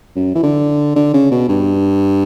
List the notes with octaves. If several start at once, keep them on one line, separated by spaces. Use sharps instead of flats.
F#2
E3
D3
D3
C#3
B2
G2